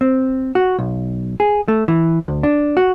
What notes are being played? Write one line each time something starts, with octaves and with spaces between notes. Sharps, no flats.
C4
F#4
B1
G#4
A3
E3
D2
D4
F#4